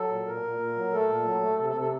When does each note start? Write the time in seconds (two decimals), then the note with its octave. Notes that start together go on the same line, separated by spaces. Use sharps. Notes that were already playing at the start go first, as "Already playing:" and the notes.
Already playing: F#3 A4
0.10 A#2
0.27 A#2 A#4
0.43 A#2
0.60 A#2
0.76 F#3
0.93 A3 A4
1.09 A#2
1.26 F#3
1.42 A3
1.58 C3 A4
1.70 A4
1.76 C3
1.81 A4